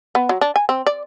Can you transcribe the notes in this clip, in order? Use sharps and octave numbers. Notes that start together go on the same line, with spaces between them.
B3
F#3
D4
G#5
C4
D5